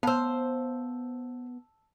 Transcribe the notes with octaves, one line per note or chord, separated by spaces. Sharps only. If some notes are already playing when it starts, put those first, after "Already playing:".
B3 C5 F5 A5 E6